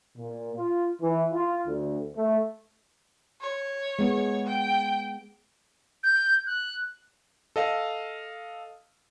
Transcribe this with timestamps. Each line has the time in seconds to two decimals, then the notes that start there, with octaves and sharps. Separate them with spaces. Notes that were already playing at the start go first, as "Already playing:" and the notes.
0.16 A#2
0.55 F4
1.01 E3
1.32 F4
1.66 D2
2.16 A3
3.41 C#5
3.99 G#3 B3
4.47 G5
6.03 G6
6.46 F#6
7.56 A4 D#5 F5